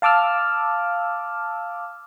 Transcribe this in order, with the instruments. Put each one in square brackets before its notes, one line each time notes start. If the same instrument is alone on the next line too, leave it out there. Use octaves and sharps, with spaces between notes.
[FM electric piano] F5 A5 D6 E6 F6